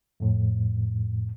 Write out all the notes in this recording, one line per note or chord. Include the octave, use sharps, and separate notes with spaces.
F2 A2